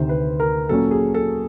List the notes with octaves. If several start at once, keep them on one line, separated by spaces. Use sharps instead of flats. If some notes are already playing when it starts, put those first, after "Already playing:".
Already playing: D2 C3 D#3 C5
B4
A#4
A#2 F#3 A#3 C#4 A4
G#4
A4